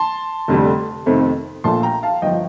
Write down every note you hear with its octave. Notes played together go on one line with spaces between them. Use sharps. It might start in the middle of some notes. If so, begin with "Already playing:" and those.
Already playing: A5 C6
F1 F2 D3 G3
F2 C3 D#3 A3 C4
A#1 A#2 F3 A3 A5 C6
G5 A#5
F5 A5
G1 F3 D#5 G5